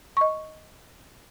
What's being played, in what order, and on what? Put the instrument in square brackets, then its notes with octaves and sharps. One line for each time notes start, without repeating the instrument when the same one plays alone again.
[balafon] D#5 C#6